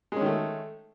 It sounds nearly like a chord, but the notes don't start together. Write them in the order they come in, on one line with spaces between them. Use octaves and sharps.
G#3 C#4 D#3 A3